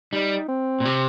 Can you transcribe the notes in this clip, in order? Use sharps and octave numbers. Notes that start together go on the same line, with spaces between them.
G3 D#4
C4
A#2
C3